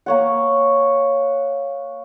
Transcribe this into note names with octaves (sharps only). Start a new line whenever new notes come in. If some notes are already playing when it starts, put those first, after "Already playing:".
A#3 C#5 F#5